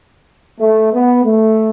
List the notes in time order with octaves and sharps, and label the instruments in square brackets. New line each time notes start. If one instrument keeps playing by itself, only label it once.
[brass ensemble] A3
B3
A3